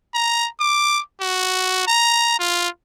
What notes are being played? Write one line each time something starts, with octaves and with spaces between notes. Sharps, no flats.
A#5
D6
F#4
A#5
F4